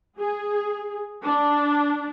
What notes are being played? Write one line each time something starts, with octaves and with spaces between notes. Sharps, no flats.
G#4
D4